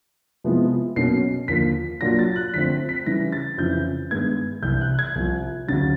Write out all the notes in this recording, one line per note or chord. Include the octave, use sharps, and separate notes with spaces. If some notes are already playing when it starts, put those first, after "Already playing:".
C3 F3 G#3 B3 E4
B2 F#3 A#3 C#4 C7
D#2 D3 F3 A#3 B6
A#2 F#3 A#3 D4 F4 A#6
A6
F#6
D3 F3 A3 C4 B6
B6
C#3 E3 G3 A#6
A6
F2 C#3 E3 G6
G2 D#3 G#3 B3 G#6
C2 C3 E3 G6
F#6
G#6
C2 C3 F3
D2 C#3 F#3 A6